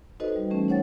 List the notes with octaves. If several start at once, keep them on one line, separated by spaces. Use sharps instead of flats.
D#4 F#4 A4 B4 C5 D#5
G3
E3 A3 C#4
D#4 C5 C#5 F#5 G5 A6